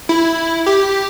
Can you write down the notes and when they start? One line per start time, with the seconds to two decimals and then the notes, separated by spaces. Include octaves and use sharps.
0.09 E4
0.66 G4